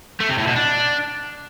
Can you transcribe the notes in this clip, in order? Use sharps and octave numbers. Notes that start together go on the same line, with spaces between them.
A3
C3
A2
B2
D4